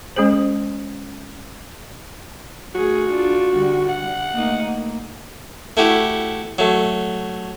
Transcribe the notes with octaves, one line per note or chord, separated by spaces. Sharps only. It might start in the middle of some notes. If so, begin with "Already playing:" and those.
G#3 C#4 G#4 C5
A3 F#4 G#4
D4 F4
D3 G3
F#5
A3 A#3 D#4
A#3
A3 E4 F#4 G4
F#3 A3